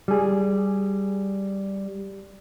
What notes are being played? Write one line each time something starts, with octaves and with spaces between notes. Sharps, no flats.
G3 G#4